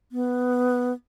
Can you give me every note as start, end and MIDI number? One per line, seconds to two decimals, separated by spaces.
0.12 0.93 59